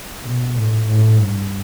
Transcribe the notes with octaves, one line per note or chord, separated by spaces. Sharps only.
B2
A2
A2
G2